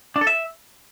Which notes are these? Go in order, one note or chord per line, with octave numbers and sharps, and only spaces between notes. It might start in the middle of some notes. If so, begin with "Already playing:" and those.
D4
A4
E5